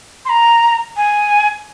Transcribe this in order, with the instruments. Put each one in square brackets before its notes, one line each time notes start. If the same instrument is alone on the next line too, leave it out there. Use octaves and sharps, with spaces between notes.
[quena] C6
A#5
G#5